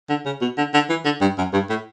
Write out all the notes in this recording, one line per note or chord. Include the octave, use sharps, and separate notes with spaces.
D3
C#3
B2
D3
D3
E3
D3
G2
F#2
G2
A2